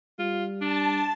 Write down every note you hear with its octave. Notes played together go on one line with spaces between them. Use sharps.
G3 F4
D4 A5